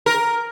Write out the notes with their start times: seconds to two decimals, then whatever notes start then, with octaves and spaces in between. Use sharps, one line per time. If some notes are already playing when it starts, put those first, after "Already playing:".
0.06 A#4